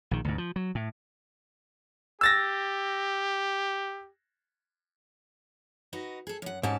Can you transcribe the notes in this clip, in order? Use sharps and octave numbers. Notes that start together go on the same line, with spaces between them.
A#1 D#3
D2 G#2
F3
F#3
A2
G4 E6 A6 A#6
D#4 F#4 B4
G#4 A4
F#2 F#5
G#2 C#4 G4 A5